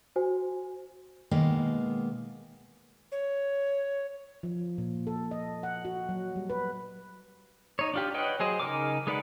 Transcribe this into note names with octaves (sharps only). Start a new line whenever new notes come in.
F#4 C5 G#5
B2 D#3 G#3 A#3 B3
C#5
F3
A#2
A4
D#5
F#5
F#4
F#3
G3
B4
D#4 C#5
D4 F4 G4
B4 C#5 D#5 F#5 G5
F#3 G#4 C5 D#5
C#3 D#4 A#4 G#5 D6
G#3 D#4 B4 D5 F#5